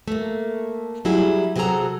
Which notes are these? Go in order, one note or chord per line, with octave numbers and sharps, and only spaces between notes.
A3 A#3
F#3 G3 E4 G#4
C3 F#3 F#4 G#4 A4 A#5